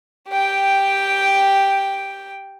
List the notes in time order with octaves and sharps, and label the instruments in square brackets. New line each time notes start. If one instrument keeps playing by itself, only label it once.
[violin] G4 G5